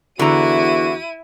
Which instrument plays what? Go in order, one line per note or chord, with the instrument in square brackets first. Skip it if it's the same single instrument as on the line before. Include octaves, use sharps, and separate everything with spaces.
[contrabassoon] E2 [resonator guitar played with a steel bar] D3 A#5 [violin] E4 D#7 [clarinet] F#4